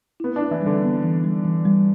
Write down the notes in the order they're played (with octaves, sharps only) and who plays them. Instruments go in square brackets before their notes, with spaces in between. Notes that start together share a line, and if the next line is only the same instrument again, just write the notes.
[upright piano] B3 [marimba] E4
[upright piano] D4
[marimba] E4
[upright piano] E3
[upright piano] D3 [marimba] G3
[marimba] B3
E3
G3
E3
G3